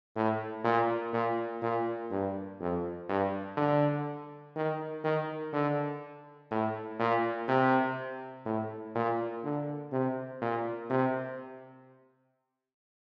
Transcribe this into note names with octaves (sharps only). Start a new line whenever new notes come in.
A2
A#2
A#2
A#2
G2
F2
G2
D3
D#3
D#3
D3
A2
A#2
C3
A2
A#2
D3
C3
A#2
C3